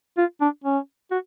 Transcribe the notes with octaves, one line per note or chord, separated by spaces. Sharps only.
F4
D4
C#4
F#4